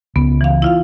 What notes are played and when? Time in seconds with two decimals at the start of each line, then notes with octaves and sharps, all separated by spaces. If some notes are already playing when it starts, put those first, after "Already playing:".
0.16 C#2 B3
0.41 E3 F5
0.62 E4 F4 F5